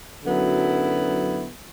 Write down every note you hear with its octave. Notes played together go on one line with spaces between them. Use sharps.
F#2 D3 F#3 B3 E4